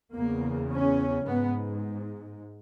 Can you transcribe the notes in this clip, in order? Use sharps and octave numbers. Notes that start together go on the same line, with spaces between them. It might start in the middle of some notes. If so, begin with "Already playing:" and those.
E2 C#3 A#3
C#4
G#2 B3